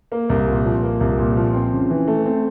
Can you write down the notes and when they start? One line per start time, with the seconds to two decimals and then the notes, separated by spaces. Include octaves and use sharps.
0.12 A#3
0.29 C2
0.47 A#2
0.65 F3
0.83 A#3
1.01 C2
1.18 A#2
1.36 F3
1.54 C4
1.72 C#3
1.90 E3
2.07 A3
2.25 C4